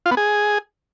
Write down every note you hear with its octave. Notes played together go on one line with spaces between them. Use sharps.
F4
B3
G#4